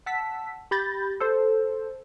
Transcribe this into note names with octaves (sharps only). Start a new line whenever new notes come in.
F#5 A5 E6 B6
G4 B5 G6 A6 A#6
A4 C5